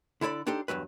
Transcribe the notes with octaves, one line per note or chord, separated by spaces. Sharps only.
D3 E4 A4 D5 B5
D4 D#4 G4 A4 C5
E2 G2 F#3 B4